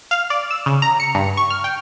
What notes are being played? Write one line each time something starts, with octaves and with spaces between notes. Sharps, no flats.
F5
D5
E6
C#3
A#5
C#7
G2
C#6
F6
G5